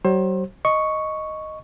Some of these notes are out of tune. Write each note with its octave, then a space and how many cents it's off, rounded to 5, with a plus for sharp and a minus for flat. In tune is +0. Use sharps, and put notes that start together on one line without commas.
F#3 +45 C5 +30
D#5 +0 C#6 +0